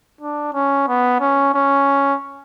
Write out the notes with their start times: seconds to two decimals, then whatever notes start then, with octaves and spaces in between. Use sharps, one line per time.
0.21 D4
0.54 C#4
0.88 B3
1.21 C#4
1.54 C#4